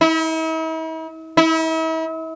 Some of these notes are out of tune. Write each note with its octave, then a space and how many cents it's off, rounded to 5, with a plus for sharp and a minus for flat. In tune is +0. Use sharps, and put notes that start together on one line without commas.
E4 -45
E4 -40